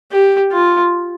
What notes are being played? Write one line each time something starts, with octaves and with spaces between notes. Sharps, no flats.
G4
F4